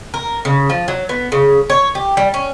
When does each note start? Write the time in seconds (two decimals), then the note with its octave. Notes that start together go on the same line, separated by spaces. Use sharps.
0.14 A#4
0.45 C#3
0.70 F3
0.88 F#3
1.09 B3
1.32 C#3
1.70 C#5
1.95 G4
2.17 G3
2.34 C#4